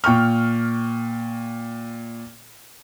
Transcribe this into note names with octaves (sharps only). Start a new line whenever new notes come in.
A#2 G5 C#6 F6